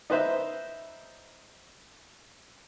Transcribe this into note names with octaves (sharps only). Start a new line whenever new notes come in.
D#4 B4 C5 E5